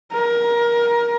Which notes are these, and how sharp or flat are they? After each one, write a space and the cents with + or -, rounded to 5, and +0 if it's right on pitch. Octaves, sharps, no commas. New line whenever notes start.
A#4 +20